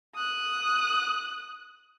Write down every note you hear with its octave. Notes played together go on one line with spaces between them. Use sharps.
D#6 F#6